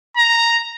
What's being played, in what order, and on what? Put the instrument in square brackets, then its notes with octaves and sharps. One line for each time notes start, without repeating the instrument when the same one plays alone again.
[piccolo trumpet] A#5